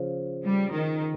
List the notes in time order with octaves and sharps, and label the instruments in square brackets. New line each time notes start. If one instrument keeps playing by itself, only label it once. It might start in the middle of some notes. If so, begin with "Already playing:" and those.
Already playing: [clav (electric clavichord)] C#3 F3
[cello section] G3
D#3